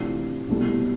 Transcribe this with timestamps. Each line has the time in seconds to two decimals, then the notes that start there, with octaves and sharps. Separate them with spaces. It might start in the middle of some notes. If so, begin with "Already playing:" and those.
Already playing: C3 E3 A3 D4 F4
0.49 C2 B2 A3 E4